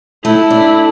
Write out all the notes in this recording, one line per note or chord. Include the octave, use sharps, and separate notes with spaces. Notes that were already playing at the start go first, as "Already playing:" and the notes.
A3 E4
D4